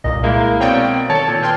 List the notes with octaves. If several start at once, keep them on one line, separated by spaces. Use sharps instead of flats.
C2 A#2 D#5
G#3 A#3 E4
B2 C4 C#5 D5 G5
D#3 A4 C#5 A5
A#2
B4 G5 C6 F6 G#6